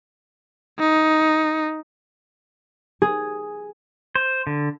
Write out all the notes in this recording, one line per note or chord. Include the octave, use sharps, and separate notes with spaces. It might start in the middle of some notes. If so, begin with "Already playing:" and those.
D#4
G#4
C5
D3